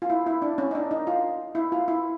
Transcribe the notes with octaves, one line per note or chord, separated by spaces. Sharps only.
F4
E4
E4
D4
C#4
D#4
D4
D#4
F4
E4
F4
E4